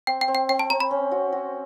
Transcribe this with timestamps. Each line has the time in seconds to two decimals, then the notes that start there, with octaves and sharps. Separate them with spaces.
0.07 C4 G5
0.21 G5
0.28 C4
0.35 G5
0.49 C4 G5
0.59 A5
0.70 C4 A#5
0.80 B5
0.91 C#4
1.11 F#4
1.32 F#4